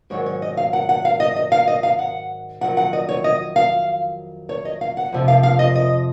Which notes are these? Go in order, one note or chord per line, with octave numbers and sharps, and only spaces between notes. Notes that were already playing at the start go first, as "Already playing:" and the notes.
G#2 D#3 F#3 C#5
C#5
D#5
F5
F#5
F#5
F5
D#5
D#5
F5
D#5
F5
F#5
F2 D#3 F#3 F#5
F#5
D#5
C#5
D#5
F5
C#5
D#5
F5
F#5
F2 C3 F3
F5
F5
D#5
D#5